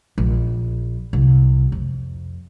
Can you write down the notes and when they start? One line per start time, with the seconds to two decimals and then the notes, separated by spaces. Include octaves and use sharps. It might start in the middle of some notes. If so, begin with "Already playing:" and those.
0.18 A#1
1.13 C2
1.72 F2